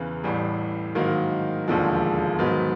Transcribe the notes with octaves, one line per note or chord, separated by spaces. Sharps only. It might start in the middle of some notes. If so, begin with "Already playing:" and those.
Already playing: E2 C#3 E3
A1 A2 E3 G3
G#2 D#3 F#3 A#3
E1 D#2 D3 F3 G#3
G#2 D#3 F#3 B3